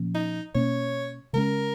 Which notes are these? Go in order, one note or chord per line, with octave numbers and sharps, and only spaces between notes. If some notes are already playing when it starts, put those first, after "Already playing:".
Already playing: A#2 F3 A#3 C#4
D#4
B2 A#3 C#4 C#5
C#3 G#3 C#4 A#4